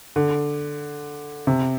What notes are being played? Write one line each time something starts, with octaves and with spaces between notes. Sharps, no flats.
D3
C3